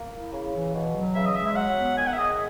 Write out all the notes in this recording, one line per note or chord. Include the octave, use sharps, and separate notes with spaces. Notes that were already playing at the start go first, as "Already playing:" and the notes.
Already playing: A#3
E4
C#3
E3
B2
F#3
C#3 E5
D#5
G#3 E5
E5
F#3 F#5
B3
D#3 G#5
F#5
E5
G#3 D#5